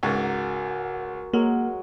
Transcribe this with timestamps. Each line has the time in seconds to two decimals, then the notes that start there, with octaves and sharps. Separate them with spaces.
0.03 C#2 G#2 F#4 A#4
1.34 F#3 G#3 A#3